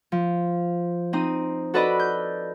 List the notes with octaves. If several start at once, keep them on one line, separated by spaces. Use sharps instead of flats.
F3
C4 D#4 D#6
F#4 A4 B4 D5 D#5 B5
G6